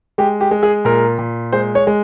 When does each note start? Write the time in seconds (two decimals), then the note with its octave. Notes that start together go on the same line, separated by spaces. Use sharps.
0.18 G#3 G4
0.41 G4
0.51 G#3
0.63 G#4
0.85 A#2 A#4
1.19 A#2
1.52 G#3 C5
1.75 C#5
1.87 G#3